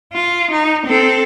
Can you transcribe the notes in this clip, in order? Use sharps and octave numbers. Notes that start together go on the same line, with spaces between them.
F4
D#4
C4 A4